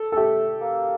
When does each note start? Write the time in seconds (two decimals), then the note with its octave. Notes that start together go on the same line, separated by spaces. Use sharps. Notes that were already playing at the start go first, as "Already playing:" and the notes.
Already playing: A4
0.12 A4
0.17 A3 G4
0.61 A#3